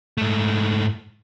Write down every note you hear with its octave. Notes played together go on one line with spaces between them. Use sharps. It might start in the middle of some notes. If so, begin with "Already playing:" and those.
G#2 A3